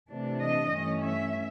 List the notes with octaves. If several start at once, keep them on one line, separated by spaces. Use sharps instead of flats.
C3 E3 A3 D4
D#5
G2 E3 A3 C#4
E5